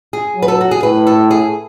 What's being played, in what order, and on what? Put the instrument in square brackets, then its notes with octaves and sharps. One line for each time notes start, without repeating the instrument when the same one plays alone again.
[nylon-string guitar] G#4
[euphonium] F#3
[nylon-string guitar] B4
A4
F#4
G#4
[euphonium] A2 [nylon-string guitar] B4
[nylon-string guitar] A4
G#4